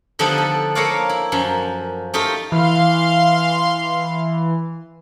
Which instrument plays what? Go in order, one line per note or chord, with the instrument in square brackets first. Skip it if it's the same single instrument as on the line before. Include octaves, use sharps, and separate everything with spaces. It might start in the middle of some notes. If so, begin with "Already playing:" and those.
[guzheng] D3 F3 G3 B3 D4 D#4
A4
A#3 A4 A#4 C#5 D5 F5
E4
F#2 F3
A3 D#4 F4 G4
[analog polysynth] E3 [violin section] F5 C6